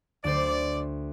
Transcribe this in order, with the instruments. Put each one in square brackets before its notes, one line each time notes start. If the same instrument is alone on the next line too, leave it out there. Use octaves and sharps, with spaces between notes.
[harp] D2 C5 [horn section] D5